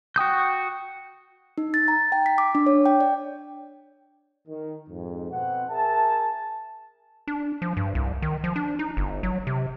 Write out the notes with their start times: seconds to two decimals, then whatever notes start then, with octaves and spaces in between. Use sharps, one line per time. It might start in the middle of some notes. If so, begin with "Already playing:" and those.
0.16 F#4 G5 D#6 G6
1.58 D#4
1.74 A6
1.88 A#5
2.12 G5
2.26 B6
2.38 D6
2.55 D4
2.66 C#5
2.86 G5
3.00 D5
4.48 D#3
4.89 F2 G#2
5.31 B2 C4 F#5
5.70 G#4 A#4 E5 G#5 A5
7.28 D4
7.62 F3
7.77 G2
7.95 C2
8.22 D#3
8.44 F3
8.56 D4
8.79 D#4
8.97 G1
9.23 F#3
9.47 C3